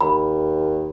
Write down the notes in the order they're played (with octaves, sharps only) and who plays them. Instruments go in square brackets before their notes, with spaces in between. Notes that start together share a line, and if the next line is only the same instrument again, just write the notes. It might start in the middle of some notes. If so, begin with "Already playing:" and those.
[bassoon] D#2 [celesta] B5